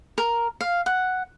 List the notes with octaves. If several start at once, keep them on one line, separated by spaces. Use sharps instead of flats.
A#4
F5
F#5